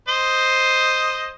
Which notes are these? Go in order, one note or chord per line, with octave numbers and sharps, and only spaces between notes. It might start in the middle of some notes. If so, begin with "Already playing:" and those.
C5 D#5